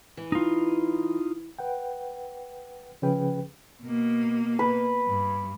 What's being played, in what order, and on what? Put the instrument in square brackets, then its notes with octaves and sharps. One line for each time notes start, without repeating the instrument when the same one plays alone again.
[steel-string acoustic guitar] E3
[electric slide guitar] D#4 F4
[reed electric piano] B4 F#5 G5
C#3 F3 C#4 G#4 B4 G5
[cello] B2 A#3
[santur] B4
[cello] G2